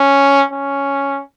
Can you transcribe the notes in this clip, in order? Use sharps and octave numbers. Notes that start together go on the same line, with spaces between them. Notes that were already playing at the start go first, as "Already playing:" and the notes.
Already playing: C#4
C#4